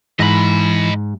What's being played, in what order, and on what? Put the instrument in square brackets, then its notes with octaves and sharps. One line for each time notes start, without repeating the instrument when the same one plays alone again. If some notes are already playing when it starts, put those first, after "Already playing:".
[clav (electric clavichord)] G#2 [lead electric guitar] E3 [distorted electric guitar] D#5 B5